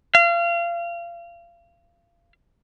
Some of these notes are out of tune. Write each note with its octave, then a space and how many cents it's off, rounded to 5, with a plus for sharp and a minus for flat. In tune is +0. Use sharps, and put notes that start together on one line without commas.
F5 -30